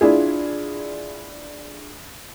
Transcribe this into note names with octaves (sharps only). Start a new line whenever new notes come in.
D4 E4 F4 G#4